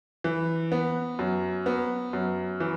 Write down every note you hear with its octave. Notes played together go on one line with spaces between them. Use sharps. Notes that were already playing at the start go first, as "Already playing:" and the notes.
E3
B3
F#2
B3
F#2
E3